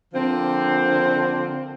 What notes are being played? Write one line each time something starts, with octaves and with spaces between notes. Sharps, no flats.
D3 F3 A#3 C4